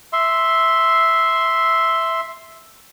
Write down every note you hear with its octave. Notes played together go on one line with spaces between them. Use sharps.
E5 C6